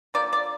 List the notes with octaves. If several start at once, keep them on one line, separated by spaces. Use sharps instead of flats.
D3 F3 A#3 D5
D5